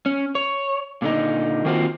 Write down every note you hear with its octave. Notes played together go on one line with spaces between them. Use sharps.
C#4
C#5
A#2 D3 D#4
D#3 A#3 C4 F4 F#4 C5